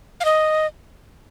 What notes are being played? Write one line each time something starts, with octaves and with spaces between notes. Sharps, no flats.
F5
D#5